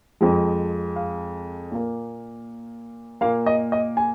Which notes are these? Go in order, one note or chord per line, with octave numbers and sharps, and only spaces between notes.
F2 F3 G#3
F5
A#2 A#3
A#2 A#3 F5
D#5
D#5
G#5